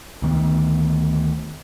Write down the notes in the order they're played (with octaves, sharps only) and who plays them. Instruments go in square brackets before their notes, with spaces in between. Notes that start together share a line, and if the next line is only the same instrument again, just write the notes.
[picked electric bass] D2 D#3 B3